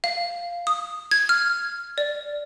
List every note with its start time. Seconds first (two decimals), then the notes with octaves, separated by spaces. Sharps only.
0.04 F5
0.67 D#6
1.11 G#6
1.29 F6
1.98 D5